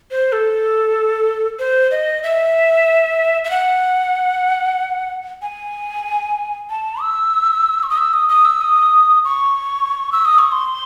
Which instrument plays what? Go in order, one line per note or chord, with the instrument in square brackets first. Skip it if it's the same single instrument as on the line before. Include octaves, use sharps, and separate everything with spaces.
[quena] C5
A4
C5
D#5
E5
E5
F#5
G#5
A5
E6
C#6
D#6
E6
D#6
D#6
E6
D#6
C#6
E6
D#6
C#6
C6